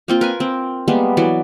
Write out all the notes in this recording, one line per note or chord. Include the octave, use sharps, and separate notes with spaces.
A#3 C4 F4
A#4 B4 G#5
C4
G3 G#3 A#3 B3
E3 F#3 D5